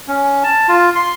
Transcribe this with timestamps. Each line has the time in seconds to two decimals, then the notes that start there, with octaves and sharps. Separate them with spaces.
0.08 C#4
0.43 A5
0.68 F4
0.95 C6